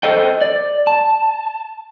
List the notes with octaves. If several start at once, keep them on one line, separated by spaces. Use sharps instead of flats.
A4 C5 D#5 G5
D5
A5